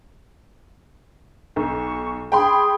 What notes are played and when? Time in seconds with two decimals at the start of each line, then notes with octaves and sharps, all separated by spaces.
1.56 B1 C#6
2.32 G#4 G5 B5 C6